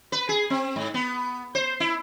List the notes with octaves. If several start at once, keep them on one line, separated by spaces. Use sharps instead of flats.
B4
G#4
C4
G#2
B3
C5
E4